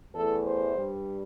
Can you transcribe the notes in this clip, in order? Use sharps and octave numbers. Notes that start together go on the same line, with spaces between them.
E2 E3 A3 A4
C5
G2 G3